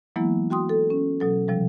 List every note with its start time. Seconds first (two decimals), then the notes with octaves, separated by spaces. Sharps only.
0.16 E3 F#3 G#3 A#3 B3 E4
0.50 F#4 G5 C6 D#6
0.69 A4
0.90 C#4
1.20 B2 F#3 A4
1.48 C3 F3 G3